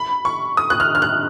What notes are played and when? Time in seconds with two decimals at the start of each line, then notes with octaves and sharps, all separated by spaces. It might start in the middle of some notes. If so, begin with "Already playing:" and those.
Already playing: B5
0.25 C#6
0.57 D#6
0.70 F#6
0.80 F6
0.95 F6
1.02 F#6